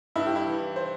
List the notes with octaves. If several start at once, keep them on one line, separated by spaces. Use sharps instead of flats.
G2 E4
G4
E4
E3
C5